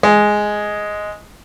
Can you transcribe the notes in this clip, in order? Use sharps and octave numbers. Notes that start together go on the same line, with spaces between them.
G#3